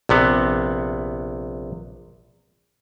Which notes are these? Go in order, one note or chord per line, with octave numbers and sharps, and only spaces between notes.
A#1 C3 B3